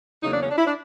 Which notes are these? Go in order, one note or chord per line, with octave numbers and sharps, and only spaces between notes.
E2 C#3 F#3 A#3 D#4
D4
C#4
D4
E4
D4